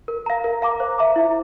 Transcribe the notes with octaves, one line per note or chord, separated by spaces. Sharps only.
A#4
F5 A#5
A#4
F5 A#5 D6
C5
E5 A#5 D6
E4